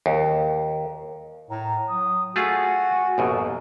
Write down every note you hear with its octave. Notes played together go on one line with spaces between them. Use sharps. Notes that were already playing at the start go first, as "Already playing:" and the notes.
D#2
A2 A#5
F#3 D#6
A3 F4 F#4 G#4 G#5
A1 F#2 B2 A#3